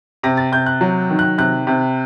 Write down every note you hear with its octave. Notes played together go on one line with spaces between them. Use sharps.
C3 A#6
A6
C3 G6
F#6
F#3
D#3
F#6
C3 F#6
C3